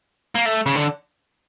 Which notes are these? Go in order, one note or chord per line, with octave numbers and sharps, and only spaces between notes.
A#3
A3
C#3
D3